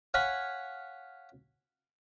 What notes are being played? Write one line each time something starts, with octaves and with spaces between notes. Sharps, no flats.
C#5 F5 F#5 G#5 B5